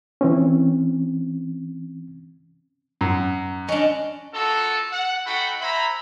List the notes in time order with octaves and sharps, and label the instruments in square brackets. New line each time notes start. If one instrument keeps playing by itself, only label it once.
[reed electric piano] E3 C4 C#4
[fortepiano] F#2
[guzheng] C#4 D4 [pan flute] D#5
[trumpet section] A#3 F4 F#4 A4
F#5
D#4 F#4 A4 F#5 G5 B5
C5 E5 G#5 A#5 B5